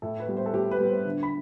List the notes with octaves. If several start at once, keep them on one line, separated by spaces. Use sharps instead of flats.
A2 A4
B4
G3 B3
C5
A4
A2 G4
B4
G3 B3
C5
D3
B5